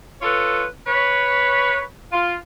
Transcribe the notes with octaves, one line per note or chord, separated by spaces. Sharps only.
F4 A4 B4 C#5
B4 C#5
F4